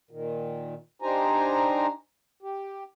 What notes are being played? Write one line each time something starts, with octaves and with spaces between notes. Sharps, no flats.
A#2 D#3
D4 D#4 G4 C5 G#5 A#5
G4